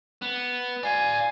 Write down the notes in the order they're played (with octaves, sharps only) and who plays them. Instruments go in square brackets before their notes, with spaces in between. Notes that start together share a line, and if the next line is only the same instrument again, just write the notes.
[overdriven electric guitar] B3
[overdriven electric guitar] D5 F5 [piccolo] G#5